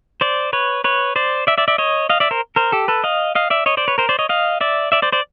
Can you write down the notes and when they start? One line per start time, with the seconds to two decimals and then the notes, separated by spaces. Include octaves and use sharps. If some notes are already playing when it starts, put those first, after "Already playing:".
0.21 C5 D5
0.53 B4 C#5
0.84 B4 C#5
1.16 C5 D5
1.47 D5 E5
1.58 D5 E5
1.68 D5 E5
1.78 C#5 D#5
2.09 D#5 F5
2.20 D5 E5
2.31 A#4 C5
2.56 A#4 C5
2.72 G4 A4
2.88 A4 B4
3.04 D#5 F5
3.35 D#5 F5
3.50 D5 E5
3.66 C#5 D#5
3.77 C5 D5
3.88 B4 C#5
3.98 A#4 C5
4.09 C5 D5
4.19 C#5 D#5
4.29 D#5 F5
4.61 D5 E5
4.92 D5 E5
5.02 C5 D5
5.12 C5 D5